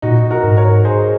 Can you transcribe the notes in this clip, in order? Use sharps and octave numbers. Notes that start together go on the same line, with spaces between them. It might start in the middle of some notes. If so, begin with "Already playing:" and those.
A#2 D#4 F#4
F#4 A#4
G#2
A#4 C#5
G#4 C5